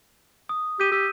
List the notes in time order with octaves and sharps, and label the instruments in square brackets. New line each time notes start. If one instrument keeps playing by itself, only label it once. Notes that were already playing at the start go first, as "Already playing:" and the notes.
[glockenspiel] D#6
[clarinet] G4 [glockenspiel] G6 D#7
[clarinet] G4 [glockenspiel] E6